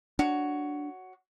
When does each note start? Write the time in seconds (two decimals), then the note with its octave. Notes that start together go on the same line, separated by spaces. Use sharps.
0.19 D4 F#4 C#5